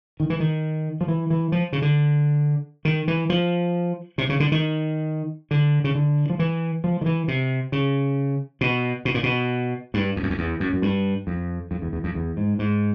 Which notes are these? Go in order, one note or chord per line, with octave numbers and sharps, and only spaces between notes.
D#3
E3
D#3
F3
E3
E3
F3
C#3
D3
D#3
E3
F3
C3
C#3
D3
D#3
D3
C#3
D3
F3
E3
F3
D#3
E3
C3
C#3
B2
B2
A#2
B2
G2
F2
F#2
F2
E2
F#2
F#2
G2
F2
F2
E2
E2
F2
E2
G#2
G#2